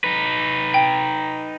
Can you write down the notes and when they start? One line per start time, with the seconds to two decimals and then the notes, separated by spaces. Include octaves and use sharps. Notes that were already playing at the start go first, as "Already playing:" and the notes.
0.04 D#4 B4
0.74 G5